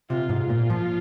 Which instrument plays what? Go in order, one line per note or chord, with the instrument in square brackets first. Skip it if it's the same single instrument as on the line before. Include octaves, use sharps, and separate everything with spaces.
[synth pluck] C3 [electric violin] F4
[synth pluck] G#2
[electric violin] F4
[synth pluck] A#2
F3